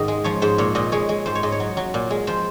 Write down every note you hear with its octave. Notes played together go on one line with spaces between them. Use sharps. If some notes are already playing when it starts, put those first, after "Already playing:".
Already playing: G#2 D#3 D#4 G#4 D#5
G#3
F3 C#5
G#2 C5
A#2 C#5
A#2 D#5
G#3 C#5
G#3
G#2 C5
C#5
G#2 D#5
C#5
F#3
F#3
A#2
G#3
F3 C5